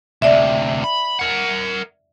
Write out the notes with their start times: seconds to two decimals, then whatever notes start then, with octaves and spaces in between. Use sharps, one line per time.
0.22 D2 C3 D5 E5
0.84 B5
1.19 A#4 F#5